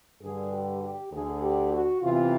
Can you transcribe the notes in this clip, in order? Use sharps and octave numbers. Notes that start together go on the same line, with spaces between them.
G2 D3 G#4
G4
G4
D2 D3 G#4
G4
F#4
E2 C3 E3 F4